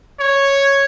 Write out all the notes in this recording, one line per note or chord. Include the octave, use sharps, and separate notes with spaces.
C#5